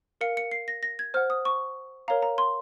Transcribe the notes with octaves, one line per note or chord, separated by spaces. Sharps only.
A#4 F5 C#7
C#7
C7
A#6
A#6
G#6
C5 F#5 F6
D#6
C#6
A#4 C#5 F5 A#5
A#5
C6